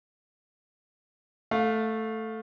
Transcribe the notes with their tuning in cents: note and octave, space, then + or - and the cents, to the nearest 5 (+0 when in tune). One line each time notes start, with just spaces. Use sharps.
A3 +0 F5 +20